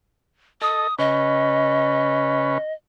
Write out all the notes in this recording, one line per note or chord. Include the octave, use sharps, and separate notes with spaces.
A4 D#5 D#6
C#3 C#4 B4 D#5